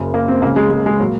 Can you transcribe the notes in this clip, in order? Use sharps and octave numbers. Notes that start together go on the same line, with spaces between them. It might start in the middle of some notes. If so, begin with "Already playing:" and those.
Already playing: F#1 F#2 C#3
A#3
C4
C#2 C#3 A#3
G#3
G#3
G#3
A#2 F#3